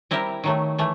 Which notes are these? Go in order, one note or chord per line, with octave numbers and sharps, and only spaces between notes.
G3 C4 E4 G4 A#4
D#3 F#3 A3
E3 A3